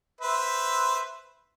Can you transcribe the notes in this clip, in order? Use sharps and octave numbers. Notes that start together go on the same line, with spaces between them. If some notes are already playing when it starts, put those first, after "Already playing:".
B4 C5 E5